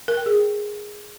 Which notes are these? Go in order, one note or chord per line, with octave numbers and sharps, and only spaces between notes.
A#4
G5
G#4